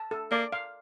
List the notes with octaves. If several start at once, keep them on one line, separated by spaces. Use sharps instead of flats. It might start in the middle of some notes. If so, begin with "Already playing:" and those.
Already playing: A5
A4
A#3 D5
F5